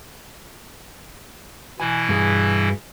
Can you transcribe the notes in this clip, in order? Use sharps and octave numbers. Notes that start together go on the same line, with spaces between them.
B2 E3 E4 G#5
G2 G#4